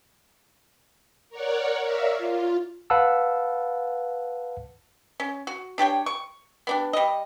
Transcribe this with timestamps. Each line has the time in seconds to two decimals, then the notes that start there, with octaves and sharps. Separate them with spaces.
1.29 A#4 C#5 D5 F#5
1.83 A#4 C#5 D5 E5 F5
2.18 F4
2.90 B4 F5 F#5 A5 E6
5.20 C#4
5.47 F#4
5.78 D4 G4 C#5 G5
6.06 C#6
6.67 B3 D4 G4
6.93 G3 D#5